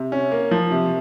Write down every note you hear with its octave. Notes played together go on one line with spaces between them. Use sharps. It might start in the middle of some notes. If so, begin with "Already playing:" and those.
Already playing: C3
C#4
A#3
F3
C3